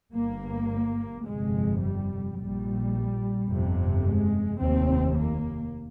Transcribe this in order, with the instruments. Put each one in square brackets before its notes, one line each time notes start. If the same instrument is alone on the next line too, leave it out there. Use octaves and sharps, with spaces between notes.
[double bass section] G1 G2 A#3
G1 F2 C3 G#3
G3
A#1 A#2 G3
G1 F2 C3
G#3
F1 D#2 C4
A#3